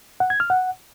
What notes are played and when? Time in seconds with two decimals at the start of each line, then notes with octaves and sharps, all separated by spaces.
0.20 F#5
0.30 G#6
0.40 F6
0.50 F#5